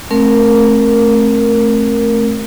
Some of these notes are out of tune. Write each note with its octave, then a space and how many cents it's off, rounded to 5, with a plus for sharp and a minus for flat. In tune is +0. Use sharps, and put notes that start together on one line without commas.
A3 -10 C4 +30 A#4 +0